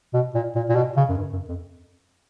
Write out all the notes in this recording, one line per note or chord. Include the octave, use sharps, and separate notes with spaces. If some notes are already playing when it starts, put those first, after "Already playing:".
B2
A#2
A#2
A#2
B2
C#3
F#2
G2
F#2
F2